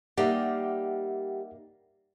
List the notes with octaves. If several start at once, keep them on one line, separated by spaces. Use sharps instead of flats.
G3 A#3 D#4 G4 E5 F#5